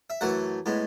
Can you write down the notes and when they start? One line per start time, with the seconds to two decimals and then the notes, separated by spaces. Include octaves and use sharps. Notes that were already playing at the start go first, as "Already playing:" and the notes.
0.10 E5
0.21 F#2 E3 A3 F#5
0.66 A2 G#3 B3